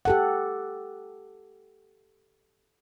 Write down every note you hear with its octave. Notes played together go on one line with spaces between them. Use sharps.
G4 A4 F#5